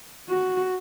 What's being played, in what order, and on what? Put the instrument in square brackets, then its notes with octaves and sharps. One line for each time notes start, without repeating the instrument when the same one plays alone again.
[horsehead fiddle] F#4